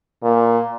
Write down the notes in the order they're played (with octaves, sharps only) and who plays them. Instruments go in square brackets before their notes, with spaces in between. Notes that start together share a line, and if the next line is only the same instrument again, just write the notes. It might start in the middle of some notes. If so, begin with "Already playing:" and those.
[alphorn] A#2